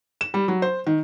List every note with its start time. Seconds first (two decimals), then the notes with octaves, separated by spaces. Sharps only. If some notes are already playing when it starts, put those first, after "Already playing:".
0.21 E7
0.34 G3
0.48 F#3
0.62 C5
0.87 D#3